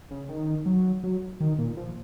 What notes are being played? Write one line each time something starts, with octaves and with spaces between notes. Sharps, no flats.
C#3
D#3
F#3
F#3
D#3
A#2
F3